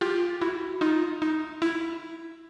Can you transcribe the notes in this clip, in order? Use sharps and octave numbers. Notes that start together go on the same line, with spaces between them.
F4 G4
E4 F#4
D#4 F4
D#4
E4